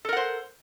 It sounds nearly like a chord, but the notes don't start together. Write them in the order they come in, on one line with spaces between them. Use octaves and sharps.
A4 A#4 F#5 C5